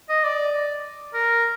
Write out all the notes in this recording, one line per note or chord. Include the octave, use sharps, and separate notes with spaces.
D#5
D5
A#4